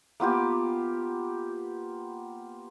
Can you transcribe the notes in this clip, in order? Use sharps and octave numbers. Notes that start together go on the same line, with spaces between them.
A#3 B3 F4 G4